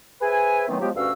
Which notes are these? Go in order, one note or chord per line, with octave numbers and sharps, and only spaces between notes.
G#4 B4 C5 E5 G#5
D#3 E3 F#3 A3 B3 C4
F3 F#3 G#3 B3 G4
D2 G2 C#4 F#4 F5 E6